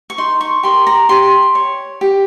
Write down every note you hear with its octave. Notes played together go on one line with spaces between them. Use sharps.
C#6
D#4 C6
C#6
G4 A#4 C6
A#5
G4 C6
C#5
G4